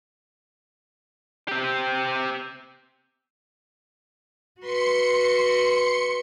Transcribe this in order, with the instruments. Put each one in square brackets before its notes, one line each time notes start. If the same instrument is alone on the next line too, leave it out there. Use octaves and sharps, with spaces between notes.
[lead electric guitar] C4 G4
[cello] F#4 B4 [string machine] C6 C#7